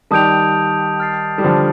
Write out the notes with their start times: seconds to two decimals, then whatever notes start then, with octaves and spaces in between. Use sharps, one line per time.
0.11 D#3 G3 A5 D#6 G6 D7 F7
1.00 F6 A6 C7
1.38 G3
1.44 D3 F3